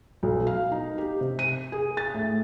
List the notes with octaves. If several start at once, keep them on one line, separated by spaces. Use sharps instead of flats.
B1
F5
D#4
G4
C3
D#7
G#4
A6
A2